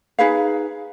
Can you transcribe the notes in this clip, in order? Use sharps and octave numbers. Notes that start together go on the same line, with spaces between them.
D#4 G#4 B4 F5